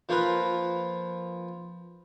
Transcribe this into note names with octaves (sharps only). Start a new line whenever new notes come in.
F3 A#3 F4 A#4 B4